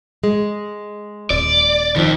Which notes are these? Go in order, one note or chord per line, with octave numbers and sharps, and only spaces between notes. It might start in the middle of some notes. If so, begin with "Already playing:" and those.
G#3
D#1 D5
F2 D#3 F3